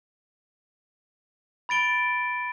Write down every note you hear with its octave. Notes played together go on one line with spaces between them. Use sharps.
B5 A6 D7 G7